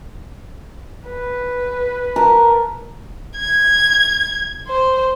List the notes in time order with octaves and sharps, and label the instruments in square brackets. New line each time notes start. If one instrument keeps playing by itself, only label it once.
[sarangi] B4
[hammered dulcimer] A#4 A5
[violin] G#6
C5